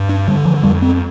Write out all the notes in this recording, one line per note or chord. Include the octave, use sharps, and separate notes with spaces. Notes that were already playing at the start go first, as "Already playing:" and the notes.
Already playing: G2
D4
D3 G3
F3
F2 G3
C4